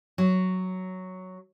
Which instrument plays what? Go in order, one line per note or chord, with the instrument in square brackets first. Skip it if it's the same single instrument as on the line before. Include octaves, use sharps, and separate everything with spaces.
[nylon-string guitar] F#3